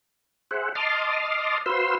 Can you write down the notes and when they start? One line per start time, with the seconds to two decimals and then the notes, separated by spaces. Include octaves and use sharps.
0.51 G#4 C5 E5 F#5
0.75 D#5 A5 C6 D6 D#6 F6
1.66 F#4 B4 C5 F5 C6 E6